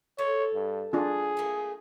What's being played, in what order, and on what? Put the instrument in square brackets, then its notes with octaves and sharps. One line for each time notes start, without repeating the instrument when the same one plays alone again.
[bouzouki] A4 [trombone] C#5
[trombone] G2
[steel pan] D4 F4 [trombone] G#4
[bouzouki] A3 A#3